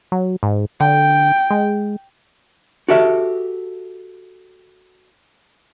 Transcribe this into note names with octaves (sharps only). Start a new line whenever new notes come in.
F#3
G#2
D3 G5
G#3
F#4 G4 A4 E5